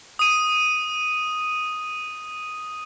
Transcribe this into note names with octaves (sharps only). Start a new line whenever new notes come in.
D#6 D#7